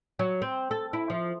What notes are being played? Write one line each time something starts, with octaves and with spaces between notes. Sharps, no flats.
F#3
C4
A4
E4
F3